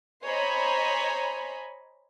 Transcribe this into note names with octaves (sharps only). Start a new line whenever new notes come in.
C5 C#5 D#5 G#5 A#5 B5